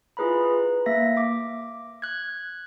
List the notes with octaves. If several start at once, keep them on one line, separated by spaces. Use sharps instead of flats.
E4 F4 G#4 B4 A#5 B5
B4
A#3 E5 A#6
D6
F#6 G#6